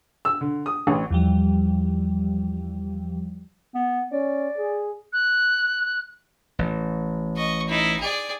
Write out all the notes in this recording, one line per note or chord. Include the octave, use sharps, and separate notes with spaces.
E6
D3
D#6
A1
E2 F3 G3
B3
C#4 D5
G#4
F#6
A1
D#5 C#6
D#4 E4
G#4 D5